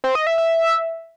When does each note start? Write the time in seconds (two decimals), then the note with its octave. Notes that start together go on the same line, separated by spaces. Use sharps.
0.04 C4
0.15 D#5
0.27 E5
0.38 E5